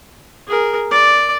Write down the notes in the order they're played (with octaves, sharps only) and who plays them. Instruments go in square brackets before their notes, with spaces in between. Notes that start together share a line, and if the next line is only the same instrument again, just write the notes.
[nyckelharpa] G#4 A#4
D5